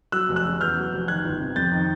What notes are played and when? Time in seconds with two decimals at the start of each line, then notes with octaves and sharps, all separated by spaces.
0.12 F#3 E6 F#6
0.29 F1
0.36 E6 F#6
0.45 C#3
0.60 E2 F6 G6
0.77 F#3
0.92 F1
1.08 D#3 F#6 G#6
1.25 G1
1.40 C3
1.56 F2 G6 A6
1.72 D#3